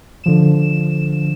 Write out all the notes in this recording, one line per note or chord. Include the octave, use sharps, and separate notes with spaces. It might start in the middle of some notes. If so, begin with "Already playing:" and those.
D3 F3 E7